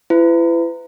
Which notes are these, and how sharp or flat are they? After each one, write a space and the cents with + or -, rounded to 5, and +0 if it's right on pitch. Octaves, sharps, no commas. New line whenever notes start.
E4 +30 B4 +35